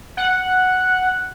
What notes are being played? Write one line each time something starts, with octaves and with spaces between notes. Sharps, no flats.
F#5